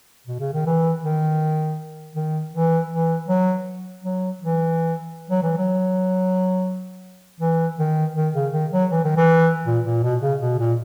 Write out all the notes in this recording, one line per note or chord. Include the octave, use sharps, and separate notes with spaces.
B2
C#3
D#3
E3
D#3
D#3
E3
E3
F#3
F#3
E3
F#3
E3
F#3
E3
D#3
D#3
C#3
D#3
F#3
E3
D#3
E3
A#2
A#2
B2
C#3
B2
A#2